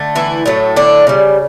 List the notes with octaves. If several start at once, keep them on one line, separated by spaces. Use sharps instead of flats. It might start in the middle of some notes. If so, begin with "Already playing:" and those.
Already playing: D3 A3
E3 E4
A2 F#3 A3
D3 D4
C#3 G3